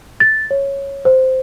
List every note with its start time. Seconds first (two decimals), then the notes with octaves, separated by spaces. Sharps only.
0.20 A6
0.51 C#5
1.05 C5